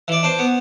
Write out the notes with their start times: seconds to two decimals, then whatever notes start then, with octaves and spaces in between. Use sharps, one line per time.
0.08 E3 D5
0.23 D4 C5
0.39 B3